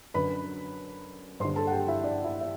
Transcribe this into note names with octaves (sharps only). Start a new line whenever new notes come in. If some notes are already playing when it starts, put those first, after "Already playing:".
F#2 D3 B4 B5
G2 D3 C5 C6
A4 A5
F#5
G4 G5
E4 E5
D4 D5
E4 E5
E5